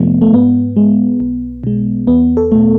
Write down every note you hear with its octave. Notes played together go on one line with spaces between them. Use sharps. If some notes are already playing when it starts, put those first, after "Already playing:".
Already playing: F2 C3 F3 A3 B3
A3
G#2 B3
G#3
B1
B2 G#3
E2 B3
A4
B2 A3